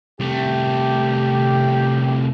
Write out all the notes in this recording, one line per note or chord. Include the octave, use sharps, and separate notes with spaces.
C2 A3 G4